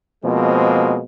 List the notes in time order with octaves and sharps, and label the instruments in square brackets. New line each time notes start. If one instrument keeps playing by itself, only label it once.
[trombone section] B2 F3 G#3 A#3 C4